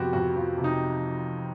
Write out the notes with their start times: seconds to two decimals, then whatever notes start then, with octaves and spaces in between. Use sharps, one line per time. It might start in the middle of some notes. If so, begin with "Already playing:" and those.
Already playing: F2 C3 F3 B3 C4 F#4 G4
0.13 F2 F#4
0.36 F3
0.58 C3
0.64 D#4